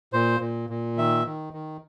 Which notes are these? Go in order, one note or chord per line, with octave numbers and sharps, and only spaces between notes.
A#2 C5
A#2
A#2
D#3 E5
D#3
D#3